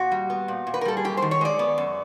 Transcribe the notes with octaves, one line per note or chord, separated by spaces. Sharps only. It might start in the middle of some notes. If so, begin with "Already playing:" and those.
Already playing: A#2 F#4
G3
B3
A#2
A#2
B4
A#4
G3 A4
G#4
F#2 G4
D#3 C5
C#5
G#3 D5
B3
F#2